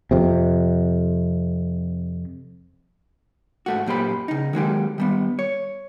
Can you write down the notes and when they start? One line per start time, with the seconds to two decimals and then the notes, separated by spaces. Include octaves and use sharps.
0.11 F2 C3
3.66 G#2 A3 F#4
3.86 F#2 A#2 G4 C5 B5
4.28 C#3 D#4
4.53 D#3 F#3 G#3 G4
4.98 D#3 G3 B3
5.39 C#5